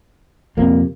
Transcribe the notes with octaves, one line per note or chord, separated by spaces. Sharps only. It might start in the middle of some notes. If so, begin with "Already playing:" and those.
F2 C3 A#3